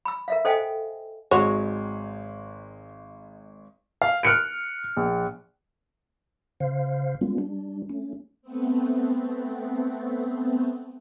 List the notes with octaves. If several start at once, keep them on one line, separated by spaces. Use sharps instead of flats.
B5 E6
A#4 E5 F5
A4 C5 D#5 F5 G5 G#5
G#1 F#3 G#3 C#5
F5
F6 F#6 C#7 D7
A#1
C#3 C5 F5
G3 G#3 A#3 B3 C#4 F4
G3 D4
A3 C#4
A3 B3 C4